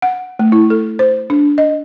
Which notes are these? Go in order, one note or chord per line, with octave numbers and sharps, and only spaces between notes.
F#5
A3
E4
A4
C5
D4
D#5